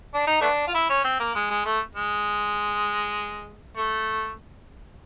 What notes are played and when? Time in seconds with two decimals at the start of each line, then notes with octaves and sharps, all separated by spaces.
0.14 D4
0.27 D#4
0.41 A3 B3 D4
0.68 F4
0.75 E4
0.90 C#4
1.04 C4
1.20 A#3
1.35 G#3
1.51 G#3
1.66 A3
1.96 G#3
3.77 A3